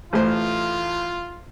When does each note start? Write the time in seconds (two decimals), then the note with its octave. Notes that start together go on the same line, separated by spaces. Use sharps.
0.13 A1 A2 F4 C5